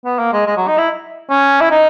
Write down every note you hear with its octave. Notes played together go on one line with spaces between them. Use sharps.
B3
A#3
G#3
G#3
F#3
D#4
E4
C#4
E4
D#4